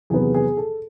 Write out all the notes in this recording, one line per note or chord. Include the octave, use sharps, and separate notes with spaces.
E2 C3 D#3 F#3 B3 G#4
G#4
A4